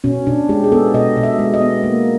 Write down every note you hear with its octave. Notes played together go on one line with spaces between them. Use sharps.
B2 C#4
B2 D4
G#3 G4
G#4
B3 A4
B2 D#5
B2
E5
G#3
D#5
B3
A#3